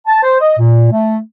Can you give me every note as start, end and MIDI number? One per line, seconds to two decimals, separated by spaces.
0.07 0.19 81
0.22 0.36 72
0.40 0.55 75
0.58 0.89 46
0.91 1.16 57